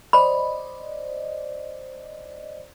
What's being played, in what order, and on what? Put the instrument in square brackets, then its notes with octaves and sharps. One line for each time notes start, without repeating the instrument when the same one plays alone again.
[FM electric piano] C5 D5 D#5 [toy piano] B5